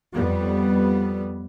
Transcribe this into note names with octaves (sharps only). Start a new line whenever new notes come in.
F2 G3 B3